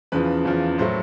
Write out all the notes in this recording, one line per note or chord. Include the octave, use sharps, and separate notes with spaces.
E2 C#3 F3 B4
E2 C#3 F3
A2 F#3 A3 C5